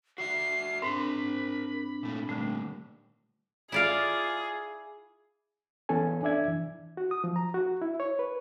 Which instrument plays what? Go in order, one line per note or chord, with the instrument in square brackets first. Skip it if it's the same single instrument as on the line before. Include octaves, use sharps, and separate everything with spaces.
[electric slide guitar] F#4 D5 E5 [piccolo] C7
[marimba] G#2 [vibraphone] C4 D4 [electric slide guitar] A#4 C5 [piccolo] B5
[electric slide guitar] A#2 A3
[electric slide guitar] A#2 G3 [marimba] D3 A3
[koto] E4 D5 F5 [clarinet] F4 [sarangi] G#4
[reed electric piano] E3 B3 C#4 A4 G#5
D4 D5 E5 G#6
E3
F#4
D#6
F3
A#5
F#4
E4
C#5
B4